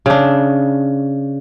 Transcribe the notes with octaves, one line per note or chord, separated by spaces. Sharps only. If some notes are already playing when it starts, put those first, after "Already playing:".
C#3 D4